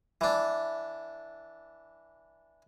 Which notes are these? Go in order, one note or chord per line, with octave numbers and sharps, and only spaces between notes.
E3 D4